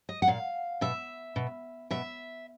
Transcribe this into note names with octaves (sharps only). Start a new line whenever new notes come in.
D#5
F#5
A#2 F5
B2 E5
B2
B2 E5